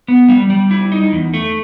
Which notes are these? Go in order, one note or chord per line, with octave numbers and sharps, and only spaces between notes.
B3
G3
G3
E4
D#4
E2
A3